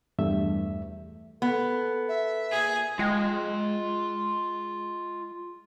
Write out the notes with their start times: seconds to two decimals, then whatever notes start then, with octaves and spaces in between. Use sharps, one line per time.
0.19 E2 G2 A3 E5
1.42 B3 A4
2.09 E5
2.51 A#2 G#4
2.99 G#3 F4 G5